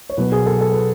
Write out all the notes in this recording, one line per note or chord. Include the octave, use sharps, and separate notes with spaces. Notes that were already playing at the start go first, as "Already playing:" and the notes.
C#5
B2 F#3 B3 B4
G#4
A4
A4
B4